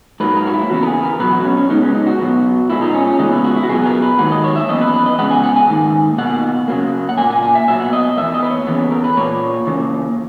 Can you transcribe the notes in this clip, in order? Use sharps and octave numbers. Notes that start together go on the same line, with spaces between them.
G#2 F#3 A#3 B4
A#4
F#4
E4
E2 C#3 E3 B3 F#4
A#4
G#4
A#4
B2 F#3 B3 B4
F#4
B3
C#4
C#4
C#3 G#3 B3 D#4
C#4
D#4
F#4
B2 F#3 B3
A#2 G#3 B3 E4
D#4
C#4
C#4
E2 C#3 G#3 B3 D#4
E4
F#4
E4
F#4
B2 F#3 B3 G#4
A#4
B4
G#2 D#3 F#3 A#3 F#5
D#5
C#5
E5
F#2 E3 B3 D#5
B4
B4
D#5
C#3 E3 G#3 B3 F#5
G#5
F#5
G#5
G#2 D#3 A#3
B2 A#3 F#5
C#3 F#3 A#3
F#5
A#2 A#3 G#5
G#5
G#5
E5
B2 F#3 B3 E5
F#5
D#5
D#5
E2 B2 A#3 E5
D#5
B4
C#5
E2 C#3 E3 B3
A#4
B4
A#2 A#3 C#5
C#3 E3 A#3